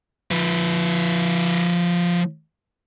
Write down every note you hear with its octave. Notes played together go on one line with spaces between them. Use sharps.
F3 B4